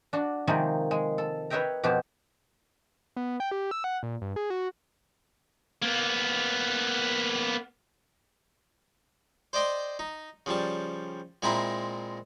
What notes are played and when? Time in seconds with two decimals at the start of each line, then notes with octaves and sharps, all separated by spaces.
0.13 D4 F#4
0.47 C3 D#3 F3 G#3 A#3
0.91 G#3
1.18 A4
1.50 B4 C#5 D#5 E5 G5 A#5
1.83 F2 B2 F#4 G4 C5
3.16 B3
3.40 G5
3.51 G4
3.71 E6
3.84 F#5
4.03 A#2
4.22 G2
4.36 G#4
4.50 F#4
5.83 A#3 B3
9.53 C5 D5 D#5 G5 C6
9.99 D#4
10.46 C#3 F3 G3 A5
11.42 A#2 G#3 C4 E4 A#5 B5